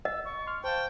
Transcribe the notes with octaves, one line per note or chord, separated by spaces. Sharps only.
D#5 E6
C#6
C6 F6
C5 F5 G5 A5